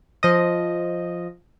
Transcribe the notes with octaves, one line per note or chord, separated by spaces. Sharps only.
F3 D#5